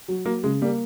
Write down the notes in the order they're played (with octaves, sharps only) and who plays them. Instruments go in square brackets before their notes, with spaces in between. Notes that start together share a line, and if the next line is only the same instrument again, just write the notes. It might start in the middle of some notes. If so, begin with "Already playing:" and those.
[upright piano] F#3
[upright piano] F#3 [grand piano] A#3
[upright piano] C#3 [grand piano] G#3
[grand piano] G3 [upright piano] A#3